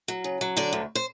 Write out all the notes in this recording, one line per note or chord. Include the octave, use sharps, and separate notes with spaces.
F#3
C#3
F#3
D3 D4 D5
D2
C5